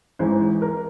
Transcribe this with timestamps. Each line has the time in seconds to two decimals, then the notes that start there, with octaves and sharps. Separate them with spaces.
0.19 A1 G#2 E3 C5
0.62 A#4